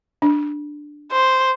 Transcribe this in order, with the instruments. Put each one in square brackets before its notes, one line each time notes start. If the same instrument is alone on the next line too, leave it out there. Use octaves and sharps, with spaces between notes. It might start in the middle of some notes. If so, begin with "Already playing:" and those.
[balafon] D4
[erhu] C5